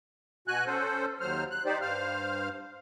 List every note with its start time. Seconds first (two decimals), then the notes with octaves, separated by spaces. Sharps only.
0.48 B2 F#4 G#5 F#6
0.66 C#4 A4 C5
1.20 D#2 F#3 C5 F6
1.51 F#6
1.65 D#4 G4 C5 D5
1.81 G2 C5 F5 F6